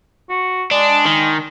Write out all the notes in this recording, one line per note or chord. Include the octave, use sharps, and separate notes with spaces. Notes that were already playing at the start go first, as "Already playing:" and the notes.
F#4
G#3 D4
D#3